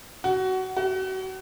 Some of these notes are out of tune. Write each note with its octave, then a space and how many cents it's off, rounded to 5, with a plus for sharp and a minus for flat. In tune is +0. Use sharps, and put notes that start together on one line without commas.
F#4 +20
F#4 +35